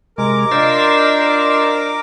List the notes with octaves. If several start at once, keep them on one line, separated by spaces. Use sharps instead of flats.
C3 G#3 A#4 D6
D4 F4 C5 D#5 E6